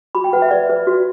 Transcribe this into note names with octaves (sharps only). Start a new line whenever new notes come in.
F#4 B5
G5
B4 F#5
E5
B4 D5
B4
F#4